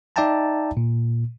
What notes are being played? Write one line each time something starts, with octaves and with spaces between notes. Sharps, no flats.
D#4 D5 E5 G5 A5 A#5
A#2